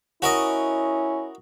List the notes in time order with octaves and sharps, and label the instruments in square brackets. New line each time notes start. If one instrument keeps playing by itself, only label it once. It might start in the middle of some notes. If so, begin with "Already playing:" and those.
[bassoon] C#4 [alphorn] E4 [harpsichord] F#4 A#4 D#5